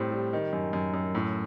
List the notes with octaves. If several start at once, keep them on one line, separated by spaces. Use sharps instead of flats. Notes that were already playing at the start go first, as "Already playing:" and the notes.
Already playing: A2 G3 C4
G3
D#3
F#2
F#2
F#2
A2